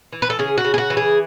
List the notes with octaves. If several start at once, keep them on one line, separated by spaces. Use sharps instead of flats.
E3
B4
A4
C#3 G#4
F#4
C#3
G#4
F#4
E3
G#4